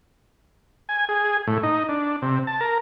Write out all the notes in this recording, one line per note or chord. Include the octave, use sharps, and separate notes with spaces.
G#5
G#4
A2
D#4
D4
C3
A5
A#4